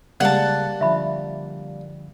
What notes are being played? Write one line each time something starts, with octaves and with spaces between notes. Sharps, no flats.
C#3 G3 G#3 A#3 F#5 A5
D3 F3 E5 B5